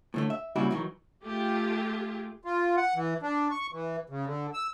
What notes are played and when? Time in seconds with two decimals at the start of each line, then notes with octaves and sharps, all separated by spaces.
0.14 A2 D3 A3
0.30 E5
0.56 A#2 C#3 G3 E4 F#4
0.71 D#3 E3 F#3
1.24 A3 F4 G4 G#4
2.44 F4
2.77 F#5
2.96 E3
3.22 D4
3.51 C#6
3.72 E3
4.10 C#3
4.25 D3
4.54 E6